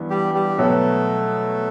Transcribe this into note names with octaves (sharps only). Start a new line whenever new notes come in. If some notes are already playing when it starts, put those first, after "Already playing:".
Already playing: G2 E3 B3
G3 G4
G3 G4
B2 F#3 A3 B3 A4